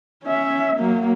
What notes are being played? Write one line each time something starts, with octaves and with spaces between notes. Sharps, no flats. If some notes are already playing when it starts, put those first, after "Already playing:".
C#4 E5
F#3 A#3